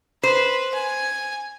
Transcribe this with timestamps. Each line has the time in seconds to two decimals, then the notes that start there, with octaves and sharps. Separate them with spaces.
0.23 B4 C5
0.74 G#5